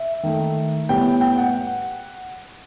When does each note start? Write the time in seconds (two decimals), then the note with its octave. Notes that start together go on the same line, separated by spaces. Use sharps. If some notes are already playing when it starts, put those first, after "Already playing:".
Already playing: E5
0.23 D#3 A3
0.89 A2 G3 B3 G5
1.21 G5
1.38 F#5